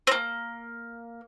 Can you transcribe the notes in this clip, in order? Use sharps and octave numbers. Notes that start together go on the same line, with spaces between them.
A#3 C4